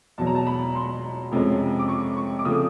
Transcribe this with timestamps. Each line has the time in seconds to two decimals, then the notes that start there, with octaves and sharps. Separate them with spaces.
0.18 E2 B2 F#3 A5
0.27 A#5
0.35 A5
0.47 B5
0.75 C6
1.31 F2 C3 F3 G#3 C#4
1.79 D6
1.88 C#6
2.16 C#6
2.39 D6
2.45 C#3 F3 A3 C4 D#6